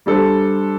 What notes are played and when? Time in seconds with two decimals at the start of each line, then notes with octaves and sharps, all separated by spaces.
0.06 G3 D4 A4 C5